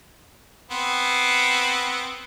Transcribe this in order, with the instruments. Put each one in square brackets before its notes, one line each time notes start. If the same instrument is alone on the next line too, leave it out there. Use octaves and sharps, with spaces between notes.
[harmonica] B3 C4